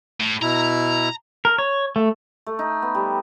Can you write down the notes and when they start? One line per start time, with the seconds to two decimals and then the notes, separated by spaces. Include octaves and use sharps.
0.20 A2
0.42 B2 E4 A#5
1.45 A#4
1.58 C#5
1.96 A3
2.47 A3
2.59 D#4
2.82 B3
2.95 G3